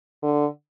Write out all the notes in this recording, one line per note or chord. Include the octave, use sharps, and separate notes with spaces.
D3